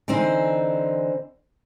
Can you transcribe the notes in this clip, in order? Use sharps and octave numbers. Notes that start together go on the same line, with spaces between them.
D3 E3 C4 D#4 C5